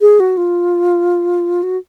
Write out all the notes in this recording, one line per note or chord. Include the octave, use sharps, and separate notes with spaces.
G#4
F#4
F4
F#4